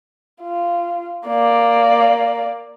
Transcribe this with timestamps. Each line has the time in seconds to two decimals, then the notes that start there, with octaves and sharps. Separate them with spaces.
0.42 F4
1.27 A#3 D5